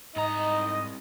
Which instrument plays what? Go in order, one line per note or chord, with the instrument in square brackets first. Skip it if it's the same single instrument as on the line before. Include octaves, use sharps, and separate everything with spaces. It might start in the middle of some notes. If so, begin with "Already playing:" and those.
[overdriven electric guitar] C2 A#5 [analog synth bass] G#2 [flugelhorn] D#4 [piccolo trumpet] D#5